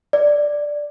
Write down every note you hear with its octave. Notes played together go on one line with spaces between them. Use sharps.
D5